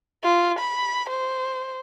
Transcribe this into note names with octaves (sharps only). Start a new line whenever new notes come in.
F4
B5
C5